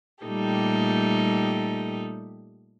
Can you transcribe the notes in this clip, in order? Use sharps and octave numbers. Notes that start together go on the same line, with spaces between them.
A#2 G3 A3 D#4 G4 A4